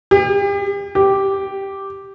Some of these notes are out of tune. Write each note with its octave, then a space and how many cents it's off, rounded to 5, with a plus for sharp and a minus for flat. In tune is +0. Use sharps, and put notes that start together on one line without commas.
G4 +40
G4 -5